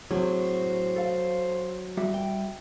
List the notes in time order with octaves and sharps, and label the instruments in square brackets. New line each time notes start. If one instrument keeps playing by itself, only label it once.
[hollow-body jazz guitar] A2 C3 G#4 [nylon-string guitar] F#3 [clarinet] C5
[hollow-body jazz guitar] A4 F5
G3 F#4 E5
[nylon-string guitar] G5